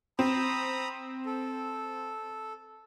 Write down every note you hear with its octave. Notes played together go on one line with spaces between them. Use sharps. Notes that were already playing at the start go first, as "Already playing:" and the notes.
C4 A#5 B5 D#6
A4